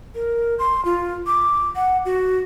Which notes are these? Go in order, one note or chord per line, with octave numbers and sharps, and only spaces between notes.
A#4
C6
F4
D6
F#5
F#4